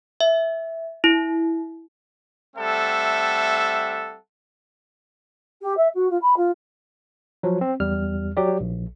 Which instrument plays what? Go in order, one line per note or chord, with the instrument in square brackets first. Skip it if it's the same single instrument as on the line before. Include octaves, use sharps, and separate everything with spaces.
[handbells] E5
E4
[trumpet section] G3 A3 C4 A4 E5 F#5
[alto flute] G4
E5
F#4
F4
B5
F4
[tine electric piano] F3 F#3
C4
E2 G3 F6
F#3 G4 D5
A#1